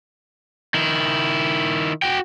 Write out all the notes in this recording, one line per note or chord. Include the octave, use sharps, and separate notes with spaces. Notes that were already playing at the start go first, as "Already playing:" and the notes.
D#3 E4
F#4 G5